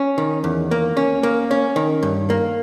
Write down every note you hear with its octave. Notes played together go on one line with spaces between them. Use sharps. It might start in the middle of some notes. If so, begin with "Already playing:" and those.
Already playing: C#4
D#3
E2
A#3
C#4
A#3
C#4
D#3
G2
A#3